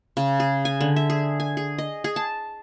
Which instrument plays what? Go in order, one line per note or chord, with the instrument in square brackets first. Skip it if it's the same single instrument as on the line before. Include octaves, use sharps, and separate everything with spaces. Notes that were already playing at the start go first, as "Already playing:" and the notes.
[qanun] C#3
G#4
G#5
D3
E5
G#4
G#5
G#4
D#5
G#4
A5